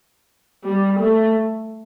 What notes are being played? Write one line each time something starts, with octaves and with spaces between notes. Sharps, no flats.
G3
A3